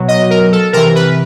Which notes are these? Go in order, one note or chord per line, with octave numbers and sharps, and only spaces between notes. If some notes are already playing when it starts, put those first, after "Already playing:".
Already playing: B2 F#3
D#5
A#4
A4
C3 E3 A#4
B4